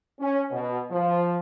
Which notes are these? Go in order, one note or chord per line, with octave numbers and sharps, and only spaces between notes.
C#4
B2
F3